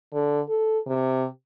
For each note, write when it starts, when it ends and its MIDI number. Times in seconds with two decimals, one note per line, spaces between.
0.12 0.40 50
0.49 0.79 69
0.87 1.26 48